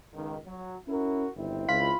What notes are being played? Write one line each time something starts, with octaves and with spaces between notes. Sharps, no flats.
C#2 D#3
F#3
C#4 E4 F#4 A#4
G1 D#3 C4 E4
C#2 F4 B5